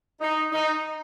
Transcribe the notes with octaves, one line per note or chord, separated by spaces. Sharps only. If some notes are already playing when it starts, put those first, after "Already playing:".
D#4
D#4